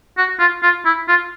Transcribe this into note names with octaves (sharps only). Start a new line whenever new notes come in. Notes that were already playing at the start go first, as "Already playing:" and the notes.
F#4
F4
F4
E4
F4